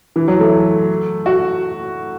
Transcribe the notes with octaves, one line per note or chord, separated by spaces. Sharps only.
E3
F#3
A3
F#4